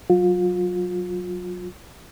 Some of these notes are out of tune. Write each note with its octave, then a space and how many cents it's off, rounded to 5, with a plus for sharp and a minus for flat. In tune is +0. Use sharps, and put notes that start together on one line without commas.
F#3 +5 F4 +30